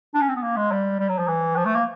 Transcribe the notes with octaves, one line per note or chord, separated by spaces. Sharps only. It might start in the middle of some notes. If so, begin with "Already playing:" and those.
D4
C#4
C4
B3
A#3
G#3
G3
G3
F#3
F3
E3
F3
A3
A#3